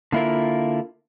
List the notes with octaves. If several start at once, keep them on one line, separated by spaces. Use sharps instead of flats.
D3 A#3 E4 F4 A#4